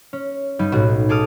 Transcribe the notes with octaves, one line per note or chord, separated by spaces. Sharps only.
C#4
G2 G3 D#4
B1 A2 F#4
G#4 A4 D6 D#6 F6